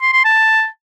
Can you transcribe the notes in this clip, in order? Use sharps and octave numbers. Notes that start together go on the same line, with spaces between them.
C6
C6
A5